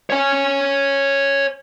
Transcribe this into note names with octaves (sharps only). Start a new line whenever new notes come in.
C#5 G#5